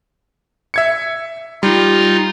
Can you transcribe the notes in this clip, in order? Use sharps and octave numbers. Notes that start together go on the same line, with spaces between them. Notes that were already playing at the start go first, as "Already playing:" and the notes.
E5 G#6 C#7
G3 D#4 F4